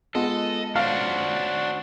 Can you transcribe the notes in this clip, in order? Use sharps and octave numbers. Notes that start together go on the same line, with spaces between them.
G#3 B3 F4 A4 D#5
C#4 D4 F#4 C5 F5